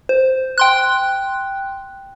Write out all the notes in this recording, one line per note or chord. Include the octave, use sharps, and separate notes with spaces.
C5
G5 C6 F#6